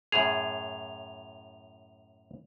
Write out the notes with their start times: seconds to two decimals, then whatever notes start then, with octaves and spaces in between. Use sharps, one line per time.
0.12 F#2 A2 G#4 F7